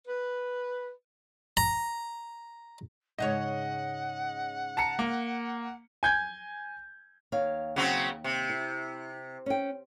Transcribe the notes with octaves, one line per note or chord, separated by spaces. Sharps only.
B4
A#5
G#2 C#3 C#5 D#5 F#5
A5 A#5 C#7
A#3
G#5 G6 G#6
D#2 C#5 F5
C#3 F#3 C4
C3
E4
C#4 G5